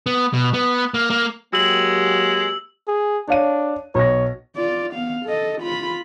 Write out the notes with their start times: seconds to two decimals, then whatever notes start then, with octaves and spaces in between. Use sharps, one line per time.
0.06 B3
0.33 B2
0.54 B3
0.94 A#3
1.10 A#3
1.53 F#3 G#3 A#3 G4 E6 F#7
2.88 G#4
3.28 D4 C#5 F5 D#7
3.95 B1 C#5 A#6
4.56 F4 D5
4.94 B3 F5
5.26 A4 D#5
5.61 F4 B5